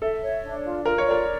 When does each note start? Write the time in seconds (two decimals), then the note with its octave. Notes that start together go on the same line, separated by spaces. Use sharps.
0.01 A4 E5
0.22 C#5
0.43 D4
0.64 F4
0.85 F4 A#4
0.98 C#5
1.06 A#4 D5